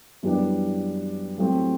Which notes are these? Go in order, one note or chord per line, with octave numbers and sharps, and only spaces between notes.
F#2 E3 G3 B3 D4
A2 F#3 A3 C4 G4